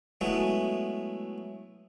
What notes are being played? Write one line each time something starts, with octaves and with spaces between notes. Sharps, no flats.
F#3 G#3 A3 B3 E4